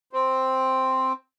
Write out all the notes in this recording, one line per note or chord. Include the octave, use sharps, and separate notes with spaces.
C4